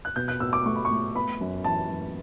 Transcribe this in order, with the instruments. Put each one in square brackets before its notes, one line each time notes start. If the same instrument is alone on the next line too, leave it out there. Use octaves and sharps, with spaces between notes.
[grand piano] F#6
B2 G6
F#6
B2 E6
D6
A3 C#6
B5
C#6
A3
B3 B5
F#2
E3 A5
F#2